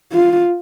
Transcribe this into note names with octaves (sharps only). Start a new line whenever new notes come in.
F4